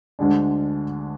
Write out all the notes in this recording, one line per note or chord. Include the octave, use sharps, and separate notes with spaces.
D2 D3 G#3 D4